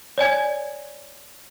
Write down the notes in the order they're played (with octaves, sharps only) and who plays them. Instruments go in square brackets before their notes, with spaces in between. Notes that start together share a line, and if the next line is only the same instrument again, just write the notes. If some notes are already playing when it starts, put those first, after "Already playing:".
[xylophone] C#5 D5 G#5 G#6